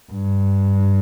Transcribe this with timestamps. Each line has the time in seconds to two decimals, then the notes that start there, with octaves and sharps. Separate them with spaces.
0.12 G2